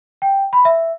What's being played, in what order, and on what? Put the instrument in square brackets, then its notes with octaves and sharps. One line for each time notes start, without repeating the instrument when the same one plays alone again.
[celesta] G5
B5
E5